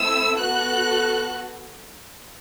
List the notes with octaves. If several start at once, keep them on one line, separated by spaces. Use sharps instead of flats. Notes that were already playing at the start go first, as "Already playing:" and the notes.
Already playing: A3 C4 E4 A4 E6
B3 F#4 A4 F#6